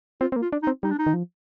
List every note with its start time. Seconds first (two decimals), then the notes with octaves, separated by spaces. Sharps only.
0.21 C4 F4
0.32 C4
0.36 A#3
0.42 F4
0.53 D4
0.63 D#4
0.67 C4
0.83 G3 D#4
0.90 D4
0.99 D#4
1.06 D#3
1.14 F3